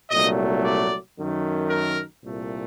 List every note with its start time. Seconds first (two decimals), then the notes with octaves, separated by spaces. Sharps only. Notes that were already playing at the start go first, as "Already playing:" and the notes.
0.11 C2 A#2 F#3 A3 D#5
0.64 D5
1.16 F#2 D#3 A3
1.69 A#4
2.23 C2 A#2 A3